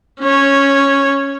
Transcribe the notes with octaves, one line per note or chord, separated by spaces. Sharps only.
C#4 C#5